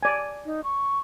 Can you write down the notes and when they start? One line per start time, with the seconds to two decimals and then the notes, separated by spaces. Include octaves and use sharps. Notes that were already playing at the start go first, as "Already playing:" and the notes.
0.03 D5 G#5
0.45 D#4
0.64 C#6